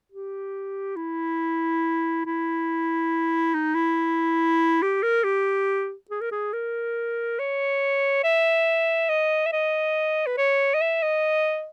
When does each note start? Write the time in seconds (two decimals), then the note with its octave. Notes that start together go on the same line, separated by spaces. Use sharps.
0.12 G4
0.96 E4
2.25 E4
3.54 D#4
3.75 E4
4.82 G4
5.03 A#4
5.24 G4
6.11 G#4
6.21 A#4
6.31 G#4
6.53 A#4
7.39 C#5
8.23 E5
9.09 D#5
9.46 E5
9.52 D#5
10.27 B4
10.38 C#5
10.74 D#5
10.81 E5
11.02 D#5